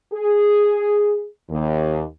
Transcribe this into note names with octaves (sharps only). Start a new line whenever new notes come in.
G#4
D#2